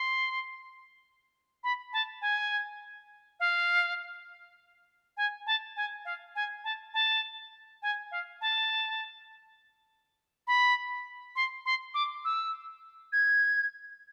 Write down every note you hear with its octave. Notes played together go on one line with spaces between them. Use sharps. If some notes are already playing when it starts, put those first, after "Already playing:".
Already playing: C6
B5
A5
G#5
F5
G#5
A5
G#5
F5
G#5
A5
A5
G#5
F5
A5
B5
C6
C6
D6
E6
G#6